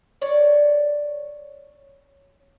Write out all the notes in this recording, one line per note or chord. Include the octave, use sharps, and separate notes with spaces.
C#5 D5